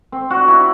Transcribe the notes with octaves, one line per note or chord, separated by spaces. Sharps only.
C4
F#4
E4